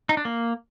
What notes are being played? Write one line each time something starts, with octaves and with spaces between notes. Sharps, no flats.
D#4
D4
A#3